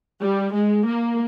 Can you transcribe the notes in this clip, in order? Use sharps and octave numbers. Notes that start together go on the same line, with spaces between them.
G3
G#3
A#3